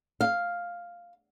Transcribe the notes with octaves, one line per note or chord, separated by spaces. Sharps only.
F5